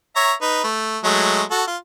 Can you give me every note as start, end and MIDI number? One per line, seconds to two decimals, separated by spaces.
0.16 0.33 73
0.16 0.33 76
0.16 0.33 82
0.41 0.63 63
0.41 0.63 71
0.64 0.98 57
1.04 1.43 54
1.04 1.43 56
1.04 1.43 57
1.51 1.63 66
1.51 1.63 69
1.67 1.77 65